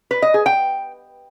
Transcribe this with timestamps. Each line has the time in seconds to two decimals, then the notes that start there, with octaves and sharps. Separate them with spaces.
0.11 B4
0.22 D#5
0.34 G#4
0.46 G5